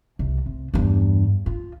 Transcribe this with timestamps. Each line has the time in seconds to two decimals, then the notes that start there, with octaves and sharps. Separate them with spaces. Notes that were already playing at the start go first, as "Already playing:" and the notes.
0.19 C2
0.46 C3
0.74 E2 G2
1.46 F4